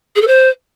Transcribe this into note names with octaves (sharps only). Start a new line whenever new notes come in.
G#4
A4
C5